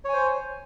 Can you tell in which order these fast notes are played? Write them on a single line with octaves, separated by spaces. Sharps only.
C#5 G#5 C5